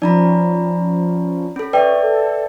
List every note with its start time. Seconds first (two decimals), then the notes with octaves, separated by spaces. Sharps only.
0.02 F3 C#4 D#4 D5 A#5 B5
1.56 C#4 A4 B5
1.73 B4 C#5 D5 E5 G5
2.02 A4